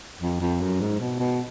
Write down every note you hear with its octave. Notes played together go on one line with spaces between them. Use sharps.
F2
F2
F#2
G#2
B2
B2